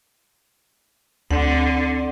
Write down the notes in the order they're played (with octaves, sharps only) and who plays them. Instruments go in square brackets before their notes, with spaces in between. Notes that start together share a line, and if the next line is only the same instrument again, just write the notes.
[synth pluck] D2 [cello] D3 [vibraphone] C4 F#5